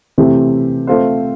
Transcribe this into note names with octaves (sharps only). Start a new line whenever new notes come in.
C3 E3 A3 C4 G4
A3 C4 F4 A4 C5